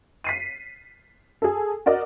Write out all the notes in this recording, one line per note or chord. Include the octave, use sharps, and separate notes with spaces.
B6 C7 D#7
G#4 A4
F#4 A#4 D5 D#5